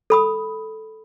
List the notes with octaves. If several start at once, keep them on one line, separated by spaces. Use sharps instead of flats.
A4 B5 D#6